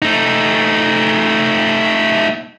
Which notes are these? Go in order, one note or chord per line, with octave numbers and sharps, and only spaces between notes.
A3 D#4